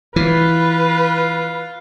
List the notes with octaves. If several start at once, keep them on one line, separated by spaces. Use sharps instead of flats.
E3 F4 B4